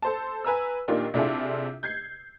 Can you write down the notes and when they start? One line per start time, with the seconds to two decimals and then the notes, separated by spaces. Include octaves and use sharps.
0.02 A4 C5 A5
0.44 B4 G#5 A#5 E6
0.88 A#2 D#3 A#3 D4 F4 G4
1.14 C3 D4 E4 F4 G#4 A4
1.83 G6 G#6 C7